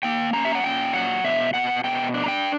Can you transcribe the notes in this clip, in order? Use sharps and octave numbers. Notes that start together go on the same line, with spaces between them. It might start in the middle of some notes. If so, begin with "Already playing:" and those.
A#3 G5
C#4 A#5
E5
F#5
A#2 G5
F#3 F#5
B2 E5
B2 F#5
B2 G5
D4
A#5
G5